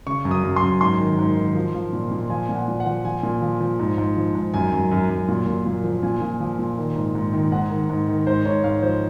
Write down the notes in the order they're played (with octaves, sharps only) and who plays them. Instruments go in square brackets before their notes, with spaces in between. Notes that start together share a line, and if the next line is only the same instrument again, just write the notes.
[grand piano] C#3 C#6
F#2
D#6
F#2
C6
F#2
G#2 C6
D#3
G#2
D#3
F3
F3
A#2
A#2
F3 G#5
A#2
F#5
A#2
F#5
F3
F3 G#5
A#2
F3
F3
G#2
G#2
F3
G#2
F#2 G#5
F#2
F#2
F#2
A#2
A#2
A#2
F3
A#2 G#5
A#2
F3
A#2
D#3
G#2
G#2
D#3
G#2 F#5
D#3
G#2
D#3
G#2 C5
G#2 C#5
G#2 F5
F3 C5